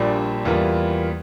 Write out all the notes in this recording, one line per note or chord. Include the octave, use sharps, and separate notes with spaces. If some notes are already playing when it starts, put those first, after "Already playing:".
Already playing: A#1 A#2 G3 D4
E2 E3 G3 A#3 F4